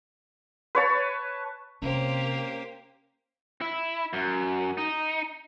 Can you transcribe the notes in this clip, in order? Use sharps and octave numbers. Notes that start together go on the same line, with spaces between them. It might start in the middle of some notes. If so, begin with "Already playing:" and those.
B4 C#5 A5
C3 A#3 C#4 G4 C5
E4
F#2
D#4